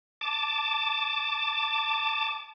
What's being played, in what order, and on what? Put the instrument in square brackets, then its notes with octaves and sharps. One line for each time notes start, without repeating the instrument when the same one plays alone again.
[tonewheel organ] A5 D6